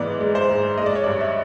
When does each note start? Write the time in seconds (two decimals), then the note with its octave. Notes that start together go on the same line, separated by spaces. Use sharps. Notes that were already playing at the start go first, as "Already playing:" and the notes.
Already playing: G#2 E3 B3 D5
0.20 G#3
0.35 C5
0.49 G#2
0.78 G#3 D#5
0.86 D5
0.95 C#5
1.04 G2 D5
1.21 E5